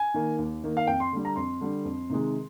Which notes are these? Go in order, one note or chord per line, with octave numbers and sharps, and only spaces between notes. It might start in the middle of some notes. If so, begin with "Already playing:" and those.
Already playing: G#5
D#3 A#3
D#2
D#3 A#3
F5
F2 G5
C6
D3 G3
A#5
F2 C6
D3 G3
F2
C3 D#3 G#3